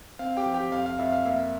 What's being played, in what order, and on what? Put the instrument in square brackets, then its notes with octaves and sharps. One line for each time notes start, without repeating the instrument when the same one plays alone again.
[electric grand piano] C4 F5
G4 G5
F3
G4 G5
F2 F5
F5
F2 E5
F5
A#3 E5